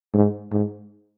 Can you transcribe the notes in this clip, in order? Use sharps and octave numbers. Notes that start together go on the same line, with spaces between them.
G#2
G#2